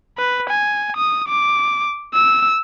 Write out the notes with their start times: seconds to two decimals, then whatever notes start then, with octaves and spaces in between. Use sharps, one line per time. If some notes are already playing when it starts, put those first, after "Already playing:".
0.18 B4
0.50 G#5
0.97 D#6
1.29 D6
2.14 E6